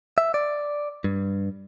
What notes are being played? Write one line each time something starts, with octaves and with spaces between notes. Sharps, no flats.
E5
D5
G2